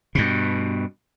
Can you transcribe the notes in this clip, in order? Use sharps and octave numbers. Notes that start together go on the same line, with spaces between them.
G2 B2